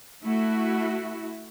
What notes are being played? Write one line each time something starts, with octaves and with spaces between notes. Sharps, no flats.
A3 E4 F#4